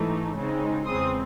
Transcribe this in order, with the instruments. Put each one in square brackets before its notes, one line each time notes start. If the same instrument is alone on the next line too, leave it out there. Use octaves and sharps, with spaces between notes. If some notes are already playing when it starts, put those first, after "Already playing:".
Already playing: [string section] G#2 E3 A3 D#4
C#3 G#3 C4 D#4
E2 C#3 G#3 C4 C6 D#6